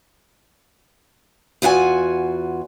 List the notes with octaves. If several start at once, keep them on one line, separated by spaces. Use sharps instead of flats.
E2 F4 F#4 G#5